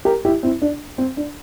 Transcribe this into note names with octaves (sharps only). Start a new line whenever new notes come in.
G4 A#4
E4 G4
C4 E4
D4
C4
D4